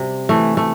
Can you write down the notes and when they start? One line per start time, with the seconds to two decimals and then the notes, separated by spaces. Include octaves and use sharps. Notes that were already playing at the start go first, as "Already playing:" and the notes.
Already playing: C3 G3
0.29 E3 A3
0.57 A3